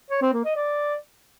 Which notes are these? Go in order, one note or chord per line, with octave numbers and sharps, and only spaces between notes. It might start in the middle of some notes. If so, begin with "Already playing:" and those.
C#5
C4
A#3
D#5
D5